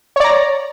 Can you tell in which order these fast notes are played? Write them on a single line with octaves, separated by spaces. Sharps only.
C#5 D5 A#5